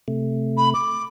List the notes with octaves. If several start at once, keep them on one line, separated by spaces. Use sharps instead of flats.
C3 A3
B5
D6